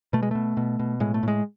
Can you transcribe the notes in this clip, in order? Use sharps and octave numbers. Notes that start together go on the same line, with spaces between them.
B2 A3
G#3
B2 A3
B2
B2
A2 G#3
A3
A2 G#3